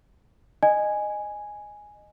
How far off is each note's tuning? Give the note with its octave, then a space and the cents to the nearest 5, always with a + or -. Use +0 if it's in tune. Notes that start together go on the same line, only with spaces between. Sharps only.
D#5 -20 G#5 +0